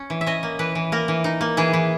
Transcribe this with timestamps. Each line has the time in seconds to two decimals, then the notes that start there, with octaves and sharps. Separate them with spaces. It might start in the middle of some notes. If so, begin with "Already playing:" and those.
Already playing: C#4
0.10 E3
0.21 E5
0.26 C#4 D#5
0.43 A#3
0.59 E3 B4
0.75 E3
0.92 A#3 A#4
1.08 E3
1.24 D#4
1.41 A#3
1.57 E3 G#4
1.73 E3